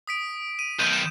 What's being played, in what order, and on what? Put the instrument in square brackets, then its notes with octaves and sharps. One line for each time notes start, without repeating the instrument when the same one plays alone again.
[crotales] D#6 B6 D7
D#7
[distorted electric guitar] B1 D#3 [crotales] G6 D#7
[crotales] E7